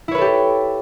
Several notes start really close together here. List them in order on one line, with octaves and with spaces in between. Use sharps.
E4 C#5 B4 A4 G4